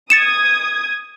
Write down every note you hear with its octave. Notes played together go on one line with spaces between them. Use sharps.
D#6 G#6 A6 C#7 E7